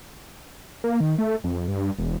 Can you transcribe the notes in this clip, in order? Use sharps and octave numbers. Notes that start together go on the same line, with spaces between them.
A#3
D#3
A3
F2
G2
E1